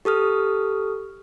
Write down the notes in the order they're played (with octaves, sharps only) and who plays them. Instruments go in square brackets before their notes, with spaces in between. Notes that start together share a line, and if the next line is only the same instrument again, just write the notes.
[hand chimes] G4 A4 D#6 F6